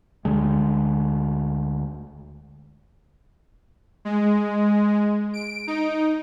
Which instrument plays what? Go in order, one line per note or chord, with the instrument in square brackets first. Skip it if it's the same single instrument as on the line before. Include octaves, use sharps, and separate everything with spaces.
[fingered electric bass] D2 D3 G#3
[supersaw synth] G#3
D7
D#4